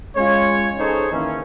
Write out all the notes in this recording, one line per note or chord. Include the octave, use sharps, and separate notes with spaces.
G#3 C#4 F4 C#5
C#4 D#4 G#4 A4 C5 C#5
D#3 E3 A#3 C#4